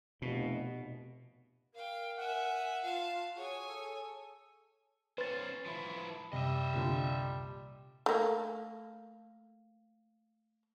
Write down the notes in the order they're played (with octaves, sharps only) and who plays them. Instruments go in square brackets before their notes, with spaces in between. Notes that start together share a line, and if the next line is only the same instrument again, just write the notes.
[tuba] F1 [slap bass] B2
[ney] A#4 [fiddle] F5 G5
[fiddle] E5 G#5 [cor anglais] F#5
[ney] F4 [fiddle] F5 A5
[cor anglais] F#4 [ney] G#4 [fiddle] C#5 G#5
[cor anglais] A4
[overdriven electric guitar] C#4 C5 [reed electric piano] B4 A6
[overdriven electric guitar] F3 E4
[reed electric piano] F#2 C3 [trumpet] G3 [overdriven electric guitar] D#5 E5
[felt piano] C2 A#2 D3
[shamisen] A3 A#3